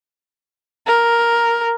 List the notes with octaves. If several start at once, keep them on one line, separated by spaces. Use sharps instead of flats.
A#4